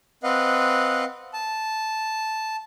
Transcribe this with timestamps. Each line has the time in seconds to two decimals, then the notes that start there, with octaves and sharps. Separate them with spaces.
0.23 C4 B4 D#5 F5 F#5
1.33 A5